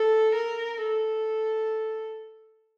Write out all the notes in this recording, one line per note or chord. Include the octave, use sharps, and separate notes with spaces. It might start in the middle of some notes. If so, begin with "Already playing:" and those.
Already playing: A4
A#4
A4